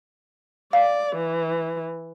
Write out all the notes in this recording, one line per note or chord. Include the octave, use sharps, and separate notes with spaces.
D5 F5
E3